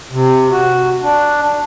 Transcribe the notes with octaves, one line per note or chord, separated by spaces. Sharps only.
C3
F#4
D4